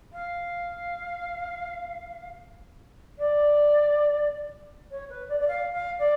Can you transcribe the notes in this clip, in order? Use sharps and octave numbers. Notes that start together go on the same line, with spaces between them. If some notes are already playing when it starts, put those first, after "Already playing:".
F5
D5
C#5
B4
D5
D5
F5
F5
D5